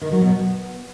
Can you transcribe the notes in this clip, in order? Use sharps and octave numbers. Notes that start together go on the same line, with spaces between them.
D#3
F#3
B2
B3